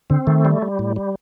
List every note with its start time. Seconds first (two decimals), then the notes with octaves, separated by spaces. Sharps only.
0.10 D3 C4
0.27 D#3 A3
0.45 G3
0.62 G3
0.79 A2
0.96 G3